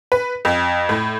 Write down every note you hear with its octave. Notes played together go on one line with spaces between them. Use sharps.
B4
F2
A2